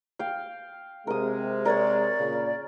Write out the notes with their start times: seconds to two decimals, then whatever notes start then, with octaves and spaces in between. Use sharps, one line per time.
0.19 F5 G5
1.07 C3 G#3 A#4 D#6
1.66 A#4 C#5 D5
2.19 A#2 C#3